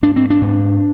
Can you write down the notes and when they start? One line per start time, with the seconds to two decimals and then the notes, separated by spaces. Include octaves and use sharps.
0.03 G#2 D4
0.16 C4
0.30 D4
0.41 G#2